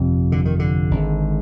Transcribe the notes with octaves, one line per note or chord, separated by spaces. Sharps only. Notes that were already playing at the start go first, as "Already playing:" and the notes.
Already playing: G1 F2 C3
D3
D#3
D3
G#1 G#2